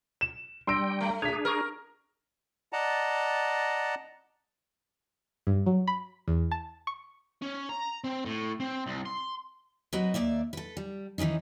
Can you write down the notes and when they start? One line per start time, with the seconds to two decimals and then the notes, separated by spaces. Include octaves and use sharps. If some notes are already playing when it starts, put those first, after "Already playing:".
0.21 E7
0.67 G3 D4 G5 C6 E6 A#6 D7
1.01 A3
1.22 D4 G#4 G#6 B6 F7
1.45 A#4 C#6 F6
2.73 D5 D#5 F#5 A5 A#5
5.47 G2
5.66 F#3
5.88 B5
6.28 E2
6.51 A5
6.87 C#6
7.42 C#4
7.69 A#5
8.04 C4
8.25 A2
8.60 C4
8.87 C2
9.05 C6
9.93 F#3 C4 F#4 B4 D#5 A#5
10.14 D#2 A#3 D5 E5
10.53 A4 B4
10.77 G3
11.18 D#3 E3 G#3 C#4 D#4